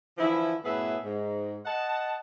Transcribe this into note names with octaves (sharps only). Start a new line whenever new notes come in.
D3 E3 F3 E4
F#2 A2 B3 G#4 B4 E5
G#2
D#5 F#5 A5